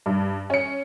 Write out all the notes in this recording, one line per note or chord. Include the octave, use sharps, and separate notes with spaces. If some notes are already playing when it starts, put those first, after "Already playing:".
G2
C#4 C#7